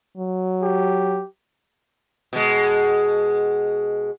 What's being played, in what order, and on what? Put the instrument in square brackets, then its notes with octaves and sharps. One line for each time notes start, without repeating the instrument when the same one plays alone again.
[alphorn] F#3
[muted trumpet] G4
[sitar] B2 G#3